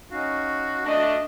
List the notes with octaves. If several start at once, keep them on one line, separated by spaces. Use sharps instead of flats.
C#4 D#4 F#4 F5
A3 D4 D#5